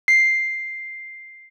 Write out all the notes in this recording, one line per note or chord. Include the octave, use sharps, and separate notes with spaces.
C7